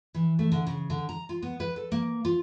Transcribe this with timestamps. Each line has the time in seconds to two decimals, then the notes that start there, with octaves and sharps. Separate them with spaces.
0.14 E3
0.39 A3
0.52 D3
0.67 C#3
0.90 D3
1.09 A#5
1.29 F4
1.42 B3
1.60 B4
1.76 A4
1.92 A#3
2.25 F4